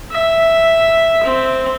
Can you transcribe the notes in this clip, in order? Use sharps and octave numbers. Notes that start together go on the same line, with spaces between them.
E5
C4